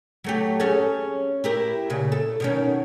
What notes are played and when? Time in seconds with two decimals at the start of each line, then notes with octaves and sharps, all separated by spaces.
0.24 F#3 A3 G4
0.60 C#4 G#4 A4
1.44 E4 G4 A#4
1.90 A#2 C#3
2.12 A4
2.40 B2 D#3 C#4